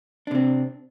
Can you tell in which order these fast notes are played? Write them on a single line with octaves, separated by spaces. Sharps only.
D4 C3 C4